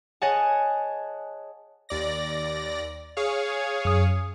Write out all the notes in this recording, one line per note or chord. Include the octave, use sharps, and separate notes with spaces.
G#4 C#5 D#5 F#5 G#5 A5
D#2 D5 A#6
G#4 C#5 F5
F#2 D#6